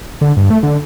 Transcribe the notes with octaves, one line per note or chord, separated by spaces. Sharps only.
D3
G2
A3
D3